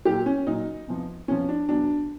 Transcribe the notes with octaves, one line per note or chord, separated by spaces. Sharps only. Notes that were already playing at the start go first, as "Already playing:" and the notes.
A#2 F#3 G4
C#4
A#2 F#3 D#4
E2 C3 F3
E2 C3 F3 C#4
D4
E2 B2 F#3 D4